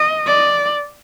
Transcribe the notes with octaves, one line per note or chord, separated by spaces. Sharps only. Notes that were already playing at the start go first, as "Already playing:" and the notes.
Already playing: D#5
D5